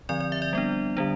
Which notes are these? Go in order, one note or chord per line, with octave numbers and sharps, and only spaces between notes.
D3 F3 C4 D5
D5
E5
D5
G3 B3 D4
D3 G3 D4